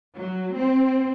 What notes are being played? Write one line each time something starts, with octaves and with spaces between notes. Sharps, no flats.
F#3
C4